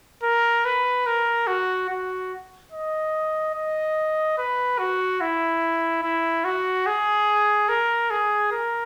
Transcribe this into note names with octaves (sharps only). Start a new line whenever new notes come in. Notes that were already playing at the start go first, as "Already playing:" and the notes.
A#4
B4
A#4
F#4
F#4
D#5
D#5
B4
F#4
E4
E4
F#4
G#4
A#4
G#4
A#4